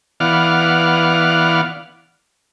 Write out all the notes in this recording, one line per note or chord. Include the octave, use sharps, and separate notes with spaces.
E3 B3 D5 F5 F#5 F6